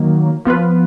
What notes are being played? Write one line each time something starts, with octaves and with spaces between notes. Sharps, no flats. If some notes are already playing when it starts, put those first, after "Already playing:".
Already playing: D#3 F#3 A#3
F3 B3 F4 B4